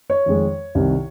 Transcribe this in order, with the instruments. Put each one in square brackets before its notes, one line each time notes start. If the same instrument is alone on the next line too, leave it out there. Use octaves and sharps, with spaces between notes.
[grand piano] C#5
F2 D#3 G#3
C2 C3 D#3